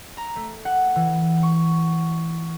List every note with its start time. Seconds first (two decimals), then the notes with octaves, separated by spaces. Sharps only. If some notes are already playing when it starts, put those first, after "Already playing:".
0.17 A#5
0.36 A3
0.65 F#5
0.96 E3
1.43 C#6